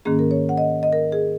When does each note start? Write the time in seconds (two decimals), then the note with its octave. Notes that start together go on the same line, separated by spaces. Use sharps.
0.05 G#2 D#3 A#3 C#4 G#4
0.19 A#4
0.31 C#5
0.49 F#5
0.58 D#5
0.83 D#5
0.93 A#4
1.12 G#4